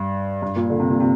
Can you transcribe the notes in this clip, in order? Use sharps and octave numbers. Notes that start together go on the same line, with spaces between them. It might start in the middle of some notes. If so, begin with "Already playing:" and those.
Already playing: G2
G2
A#2
D3
C3
A#2
C3